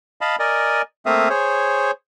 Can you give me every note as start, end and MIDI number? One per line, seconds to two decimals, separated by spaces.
0.21 0.36 75
0.21 0.36 77
0.21 0.36 81
0.21 0.36 83
0.39 0.82 70
0.39 0.82 74
0.39 0.82 75
0.39 0.82 80
1.06 1.28 57
1.06 1.28 58
1.06 1.28 60
1.06 1.28 76
1.06 1.28 77
1.06 1.28 87
1.30 1.91 68
1.30 1.91 72
1.30 1.91 73